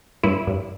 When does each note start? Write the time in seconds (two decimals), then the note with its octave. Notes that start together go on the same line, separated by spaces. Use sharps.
0.23 G2 E4
0.47 G2